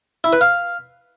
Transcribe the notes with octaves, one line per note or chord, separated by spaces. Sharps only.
E4
B4
F5